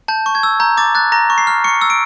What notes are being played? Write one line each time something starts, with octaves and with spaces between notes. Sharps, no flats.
A5 G6
C#6
G#6
E6
A#5 G6
D6 A6
F#6 A6
A#5 A#6
C#6
C7
F6
C#6 C#7
E6
D7